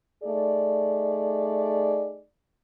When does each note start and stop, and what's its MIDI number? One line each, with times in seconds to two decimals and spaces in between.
0.24 2.22 57
0.24 2.22 63
0.24 2.22 68
0.24 2.22 74